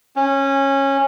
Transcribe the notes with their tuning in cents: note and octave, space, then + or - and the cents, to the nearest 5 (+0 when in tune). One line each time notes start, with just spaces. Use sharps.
C#4 -15